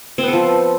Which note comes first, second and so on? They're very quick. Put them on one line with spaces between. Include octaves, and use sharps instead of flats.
C4 B3 A4 F3